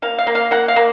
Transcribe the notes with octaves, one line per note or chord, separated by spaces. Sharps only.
A#3 F5
F5
A#3
F5
A#3 F#5
F5
A#3